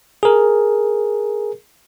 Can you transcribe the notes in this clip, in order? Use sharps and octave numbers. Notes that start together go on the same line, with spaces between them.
G#4 A#4